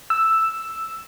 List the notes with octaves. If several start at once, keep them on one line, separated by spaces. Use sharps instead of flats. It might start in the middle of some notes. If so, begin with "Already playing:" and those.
E6